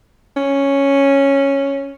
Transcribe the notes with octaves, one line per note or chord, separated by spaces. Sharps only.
C#4